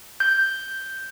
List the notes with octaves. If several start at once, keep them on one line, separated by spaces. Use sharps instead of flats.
G6